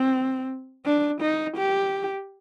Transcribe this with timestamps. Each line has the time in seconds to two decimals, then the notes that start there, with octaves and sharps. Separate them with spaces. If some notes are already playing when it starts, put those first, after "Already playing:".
Already playing: C4
0.86 D4
1.22 D#4
1.58 G4